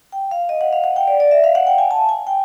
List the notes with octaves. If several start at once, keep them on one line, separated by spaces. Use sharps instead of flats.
G5
F5
D#5
F#5
F5
F#5
G5
D5
D5
E5
F5
F#5
G5
G#5
A5
G#5
G5